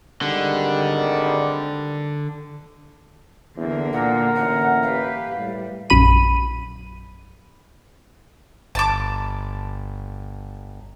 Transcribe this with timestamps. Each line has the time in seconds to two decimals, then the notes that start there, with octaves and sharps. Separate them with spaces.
0.22 G#1 D3 D#3 G3
3.56 E2 D3 A#3
3.93 A#2 A#4 F#5
4.35 A1 F#5
4.83 G4 B4 F5
5.37 A2 G3
5.90 A#1 F#2 B5 D#7
8.75 G1 A5 D6